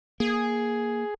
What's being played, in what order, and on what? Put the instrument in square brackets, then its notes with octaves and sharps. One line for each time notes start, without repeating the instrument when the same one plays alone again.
[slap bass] A#3 [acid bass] G#4